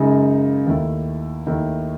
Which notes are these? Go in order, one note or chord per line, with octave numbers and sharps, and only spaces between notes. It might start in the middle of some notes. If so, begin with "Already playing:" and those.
Already playing: F#2 C#3 G#3 D#4
D#2 D#3 A3 E4
D#2 D#3 A3 E4